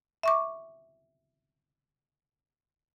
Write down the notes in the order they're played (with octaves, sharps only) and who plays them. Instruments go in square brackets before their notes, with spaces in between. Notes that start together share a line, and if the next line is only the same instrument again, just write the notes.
[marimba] E5 C#6 D6